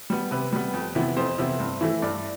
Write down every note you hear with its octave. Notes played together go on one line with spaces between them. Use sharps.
G3 B3
C3 B4
G3 B3
F2
C3 E3 B3 E4
F2 C5
C3 E3 B3 E4
G2
E3 A3 E4
G2 D5